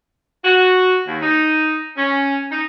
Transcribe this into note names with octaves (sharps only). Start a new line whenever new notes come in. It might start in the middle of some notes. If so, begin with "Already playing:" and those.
F#4
D#2
D#4
C#4
D#4